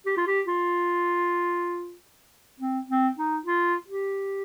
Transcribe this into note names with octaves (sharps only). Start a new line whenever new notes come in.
G4
F4
G4
F4
C4
C4
D#4
F4
G4